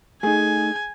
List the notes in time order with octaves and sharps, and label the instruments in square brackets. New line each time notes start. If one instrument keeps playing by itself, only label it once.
[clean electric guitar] A3 D#4 [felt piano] G#4 [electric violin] G#5